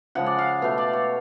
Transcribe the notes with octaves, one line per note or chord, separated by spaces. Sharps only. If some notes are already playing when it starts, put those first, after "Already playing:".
C#3 F3 G#3 F#5
D5
F5
B2 A3 F5
D5
C#5